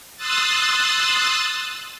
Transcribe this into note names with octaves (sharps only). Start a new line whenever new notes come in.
C6 D#6 E6 F#6 A6